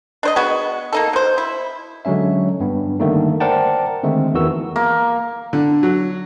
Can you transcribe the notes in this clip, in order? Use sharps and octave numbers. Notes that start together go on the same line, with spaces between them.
D4 C5 D#5
G#3 B3 F#4
A#3 D#4 A4
B2 C5
E4
D3 F#3 G#3 C#4 E5
G2 B3
D3 D#3 G3 A3 A#3 D#4
A#4 C5 D5 F#5 G5 A5
D3 D#3 G#3 A3 C4
E2 D#3 E3 F#4 E6
A#3
D3
F#3